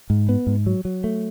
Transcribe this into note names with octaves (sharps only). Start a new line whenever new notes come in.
G#2
B3
G#2
F#3
F#3
A3